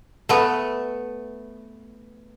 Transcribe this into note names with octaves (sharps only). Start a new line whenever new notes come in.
A3 B3